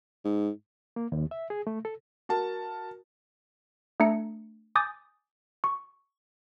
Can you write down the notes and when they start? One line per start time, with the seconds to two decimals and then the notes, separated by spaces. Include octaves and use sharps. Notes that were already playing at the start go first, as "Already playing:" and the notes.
0.25 G#2
0.96 A#3
1.12 D#2
1.31 E5
1.50 G#4
1.67 A3
1.85 A4
2.29 F#4 A#4 A5
4.00 A3 D4 A#5 C#7
4.75 G#5 D6 D#6 G6 A6
5.64 C#6